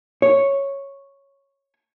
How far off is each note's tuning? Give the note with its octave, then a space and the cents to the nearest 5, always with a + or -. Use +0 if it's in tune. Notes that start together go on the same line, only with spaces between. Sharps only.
C#5 -5